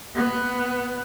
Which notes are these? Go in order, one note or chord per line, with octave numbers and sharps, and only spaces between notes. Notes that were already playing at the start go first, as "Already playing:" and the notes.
B3